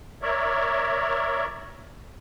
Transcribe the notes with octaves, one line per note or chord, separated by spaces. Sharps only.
A#4 C#5 D5 E5